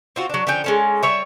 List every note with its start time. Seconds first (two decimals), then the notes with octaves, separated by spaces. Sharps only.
0.16 C4 F4 F#4
0.30 F#3 D4
0.47 D3 F3 C#4 G5
0.64 G#3 C#4 A4
1.03 G3 C#5 E5